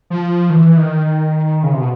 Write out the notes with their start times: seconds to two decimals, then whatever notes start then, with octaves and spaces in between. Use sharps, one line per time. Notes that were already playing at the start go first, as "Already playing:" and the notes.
0.10 F3
0.50 D#3
0.54 E3
0.77 D#3
1.63 C#3
1.72 C3
1.80 B2